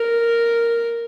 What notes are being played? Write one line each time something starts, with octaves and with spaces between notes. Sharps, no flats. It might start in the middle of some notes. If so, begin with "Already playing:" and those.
Already playing: A#4